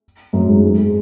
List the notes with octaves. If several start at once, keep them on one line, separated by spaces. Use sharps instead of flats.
F#2 F#3
G#2 G#3
G#2 G#3
G#3